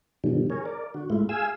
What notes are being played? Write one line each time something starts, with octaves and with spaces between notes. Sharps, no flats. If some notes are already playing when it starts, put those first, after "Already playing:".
G2 B2 D3 D#3 F3 G3
G#4 A#4 C#5
A#4 D5
D3 F#4
G#2 G#3 A3 E4 F4
G#4 F5 G#5 E6